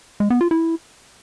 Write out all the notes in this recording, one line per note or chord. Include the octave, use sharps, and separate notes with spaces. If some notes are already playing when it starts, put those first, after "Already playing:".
G#3
B3
F4
E4